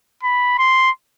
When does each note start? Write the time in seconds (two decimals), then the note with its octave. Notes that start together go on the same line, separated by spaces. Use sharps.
0.23 B5
0.58 C6